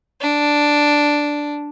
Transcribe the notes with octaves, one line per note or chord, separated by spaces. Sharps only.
D4